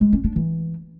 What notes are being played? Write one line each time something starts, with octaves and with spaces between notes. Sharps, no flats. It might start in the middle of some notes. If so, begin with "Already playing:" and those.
G#3
C#4
D4
E3